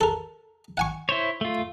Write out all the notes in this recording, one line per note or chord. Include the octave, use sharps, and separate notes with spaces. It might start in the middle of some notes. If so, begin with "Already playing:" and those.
A4 A#4
F#5 G#5 C#6
E4 C5 C#5
A3 F4